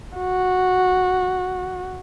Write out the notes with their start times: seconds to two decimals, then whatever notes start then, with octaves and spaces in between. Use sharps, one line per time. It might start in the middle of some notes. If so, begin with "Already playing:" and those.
0.17 F#4